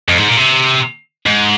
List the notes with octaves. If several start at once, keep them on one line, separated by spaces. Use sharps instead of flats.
F2
G#2
A#2
C3
G#2